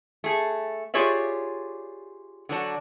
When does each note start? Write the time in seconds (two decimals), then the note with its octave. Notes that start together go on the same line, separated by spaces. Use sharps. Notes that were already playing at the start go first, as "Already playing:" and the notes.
0.24 A3 G#4
0.94 F4 G4 G#4 C#5 D5 E5
2.49 D3 F#3 D4